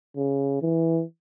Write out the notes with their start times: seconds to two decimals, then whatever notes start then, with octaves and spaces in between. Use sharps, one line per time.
0.17 C#3
0.62 E3